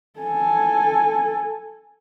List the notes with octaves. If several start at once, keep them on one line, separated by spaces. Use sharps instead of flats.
A4 G#5